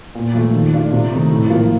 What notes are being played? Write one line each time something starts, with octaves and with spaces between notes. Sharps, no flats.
A#2
F3 A3
D#3
A3 D4 F4
C3
D#3 A3 D#4
A2
F3 A#3 F4